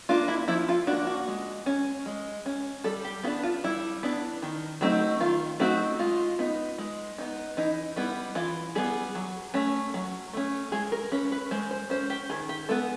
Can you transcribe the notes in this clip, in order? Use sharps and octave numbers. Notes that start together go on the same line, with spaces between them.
A#3 D4 F4
E4
F3 E4
F4
A#3 D4 F#4
F#4
G#3
C#4
G#3
C#4
G3 A4
G4
B3 D4 F#4
F4
G3 E4
B3 D4
D#3
F#3 A3 C4 D#4
D#3 F4
F#3 A3 C4 D#4 F#4
G#3 F4
B3 D#4
G#3
B3 D#4
E3 D#4
G3 B3 E4
E3 F4
G3 B3 G#4
F#3
A3 C#4
F#3
A3 C#4
G#3 G#4
A#4
C#4 B4
B4
G#3 C5
C5
C#4 C5
G4
D#3 G#4
G4
G#3 B3 A4